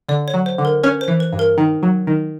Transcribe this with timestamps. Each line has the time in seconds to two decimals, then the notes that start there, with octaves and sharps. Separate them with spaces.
0.08 D3 D5
0.28 C#5
0.34 F#3
0.46 C5
0.58 D3
0.65 A#4
0.83 C#4 B4
1.01 C5
1.08 E3
1.20 B4
1.32 G2
1.39 A#4
1.58 D#3
1.83 F#3
2.07 D#3